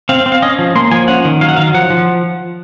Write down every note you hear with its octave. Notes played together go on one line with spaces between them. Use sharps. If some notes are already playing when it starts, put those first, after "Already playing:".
C4 F5
C4
F5
C#4 D#5
F3
A#3 C6
F3 G#5
C#4 F#5
D#3
F#3 F5
F#5
D#3 F5
F3 F#5
F3